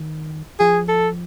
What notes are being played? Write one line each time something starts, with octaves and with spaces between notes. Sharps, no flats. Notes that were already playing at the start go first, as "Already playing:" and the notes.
Already playing: D#3
F3 G#4
A4